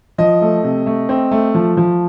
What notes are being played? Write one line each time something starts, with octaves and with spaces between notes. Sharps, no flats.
F3 D#5
A3
C3
A3
C4
A3
F3
F3